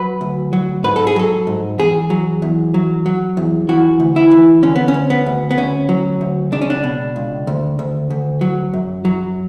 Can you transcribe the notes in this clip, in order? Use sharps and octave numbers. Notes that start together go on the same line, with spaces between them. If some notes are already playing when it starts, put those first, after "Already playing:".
Already playing: F#3 B4
D2
F#3
G#2 B4
A4
G#4
F#3 A4
G#2
E2 G#4
F#3
E2
F#3
F#3
E2
E3 F#4
D2
E4
E3
D3 C#4
B3
C#4
D2
B3
D2
B3
D2 C#4
F#3
D2
C#2 D4
C#4
D4
B2
C#2
D2
D2
D2
F#3
F#2
F#3